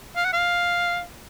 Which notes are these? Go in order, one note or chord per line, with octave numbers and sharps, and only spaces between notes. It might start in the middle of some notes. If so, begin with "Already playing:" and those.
F5
F#5
F5